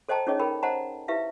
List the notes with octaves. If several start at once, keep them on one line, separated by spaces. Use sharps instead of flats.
A4 C5 D#5 G5 A5 A#5
C#4 D#4 G#4 C#5 D#5
D#4 A4 A#4 G5 B5
C5 D#5 F#5 A5 A#5
E4 G4 B4 E5 F5